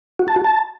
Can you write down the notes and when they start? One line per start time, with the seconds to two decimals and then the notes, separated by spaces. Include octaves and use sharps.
0.19 F#4
0.28 A5
0.36 F#4
0.44 A5